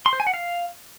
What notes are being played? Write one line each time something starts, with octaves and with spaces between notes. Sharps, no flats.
C6
C5
G#5
F#5
F5